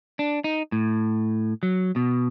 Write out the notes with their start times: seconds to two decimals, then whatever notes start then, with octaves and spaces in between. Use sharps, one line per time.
0.19 D4
0.44 D#4
0.72 A2
1.63 F#3
1.96 B2